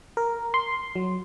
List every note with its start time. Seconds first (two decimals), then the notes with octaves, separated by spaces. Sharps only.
0.17 A#4
0.54 C6
0.96 F#3